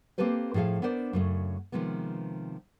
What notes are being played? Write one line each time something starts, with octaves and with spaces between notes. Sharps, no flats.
A#3 C4 G4 A4 B4 C5
A2 F3 G#4 A4 F5
B3 D4 A#4 C5 D5
F#2 C#3 A3
C3 D#3 F3 G#3 B3